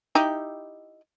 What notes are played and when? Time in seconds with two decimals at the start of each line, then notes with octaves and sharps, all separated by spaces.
0.15 D#4 E4 G4